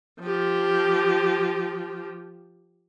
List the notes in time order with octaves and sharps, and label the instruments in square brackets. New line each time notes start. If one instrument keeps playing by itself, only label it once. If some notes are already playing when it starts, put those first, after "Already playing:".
[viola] F3 G4